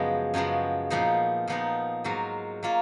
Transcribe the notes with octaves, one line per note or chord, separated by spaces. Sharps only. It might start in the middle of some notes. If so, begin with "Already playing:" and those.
Already playing: F#2 C#3 F3 G#3 B3
F#2 C#3 F3 G#3 B3
A#2 F3 B3 D#4
A#2 F3 B3 D#4
G#2 F#3 A#3 F4
F#3 A#3 F4